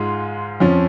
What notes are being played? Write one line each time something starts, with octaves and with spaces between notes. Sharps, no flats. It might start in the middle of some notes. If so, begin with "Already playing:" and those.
Already playing: G#2 G#3 F4
F2 F3 C#4